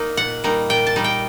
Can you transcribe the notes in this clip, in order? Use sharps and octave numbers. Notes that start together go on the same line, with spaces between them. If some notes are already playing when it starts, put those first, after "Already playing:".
Already playing: A#3 D#4 D#5
A#2 F#5
G3 A#3 D#4
A#2 G5
A5
G3 A#3 D#4
G5